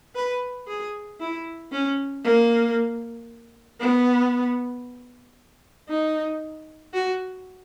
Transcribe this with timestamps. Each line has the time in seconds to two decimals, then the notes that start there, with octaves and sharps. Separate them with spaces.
0.15 B4
0.68 G#4
1.20 E4
1.72 C#4
2.24 A#3
3.81 B3
5.89 D#4
6.94 F#4